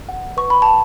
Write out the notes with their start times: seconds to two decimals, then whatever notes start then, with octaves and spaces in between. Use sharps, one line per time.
0.09 F#5
0.37 B4 C#6
0.50 B5
0.62 F#5 A5